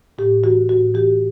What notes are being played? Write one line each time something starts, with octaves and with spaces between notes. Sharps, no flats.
A2 G4
E3 F#4
A2 F#4
E3 G4